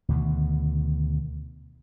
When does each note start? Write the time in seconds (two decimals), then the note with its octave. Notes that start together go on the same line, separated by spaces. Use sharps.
0.09 D2 B2 D#3